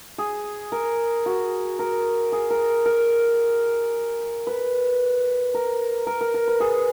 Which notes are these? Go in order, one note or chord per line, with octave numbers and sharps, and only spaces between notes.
G#4
A#4
F#4
A#4
G#4
A#4
A#4
B4
A#4
A#4
A#4
A#4
B4
G#4